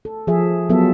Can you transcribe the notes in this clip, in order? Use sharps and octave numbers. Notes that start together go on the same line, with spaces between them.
A4
F3 G#4 E5
F#3 B3 F4 A4 E5